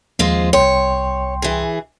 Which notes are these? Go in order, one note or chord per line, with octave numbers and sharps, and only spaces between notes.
D#2 F3 G#3 C4 F4
C2 C#5 G5 C6
E3 G#4